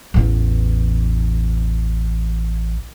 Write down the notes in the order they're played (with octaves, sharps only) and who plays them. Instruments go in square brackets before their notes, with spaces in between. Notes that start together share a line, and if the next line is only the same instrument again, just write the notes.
[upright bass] A1 E2